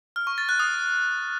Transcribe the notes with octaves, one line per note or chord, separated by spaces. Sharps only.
F6
C#6
A6
F#6
D#6